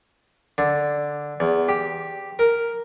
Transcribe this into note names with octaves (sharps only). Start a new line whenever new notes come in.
D3
E2
G4
A#4